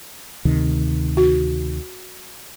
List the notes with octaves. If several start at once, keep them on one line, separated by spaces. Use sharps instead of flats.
D2 C3 D#3
F#4